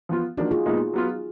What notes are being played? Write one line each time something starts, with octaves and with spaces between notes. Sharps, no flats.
F3 B3 F4
F3 A#3 D4 D#4 F#4
F4 G#4
A#2 G#3 B3 D#4
F#3 B3 F4